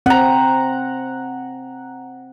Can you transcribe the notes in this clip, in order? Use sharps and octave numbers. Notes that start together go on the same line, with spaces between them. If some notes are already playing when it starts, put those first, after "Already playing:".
C4 F#5 A#5